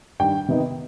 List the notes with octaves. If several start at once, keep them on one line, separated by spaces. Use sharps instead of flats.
G2 D#3 G3 G5
C3 D#3 B3 D#4